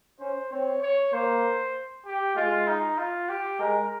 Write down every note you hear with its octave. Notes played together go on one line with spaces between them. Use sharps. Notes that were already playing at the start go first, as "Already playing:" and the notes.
C#4 C5
C4 C#5
C#5
A#3 C5
G4
G#3 F4
D#4
F4
G4
G#3 A#4